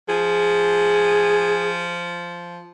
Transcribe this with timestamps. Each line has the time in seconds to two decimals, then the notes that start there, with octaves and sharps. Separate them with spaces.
0.09 F3 G#4